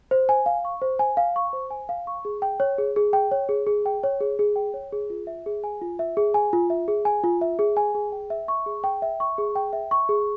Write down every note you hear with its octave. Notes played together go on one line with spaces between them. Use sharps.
C5
G#5
F5
C#6
C5
G#5
F5
C#6
C5
G#5
F5
C#6
G#4
G5
C#5
G#4
G#4
G5
C#5
G#4
G#4
G5
C#5
G#4
G#4
G5
C#5
G#4
F4
E5
G#4
G#5
F4
E5
G#4
G#5
F4
E5
G#4
G#5
F4
E5
G#4
G#5
G#4
G5
E5
C#6
G#4
G5
E5
C#6
G#4
G5
E5
C#6
G#4